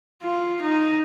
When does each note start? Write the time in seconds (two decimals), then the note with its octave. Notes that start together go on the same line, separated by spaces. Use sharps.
0.23 F4
0.61 D#4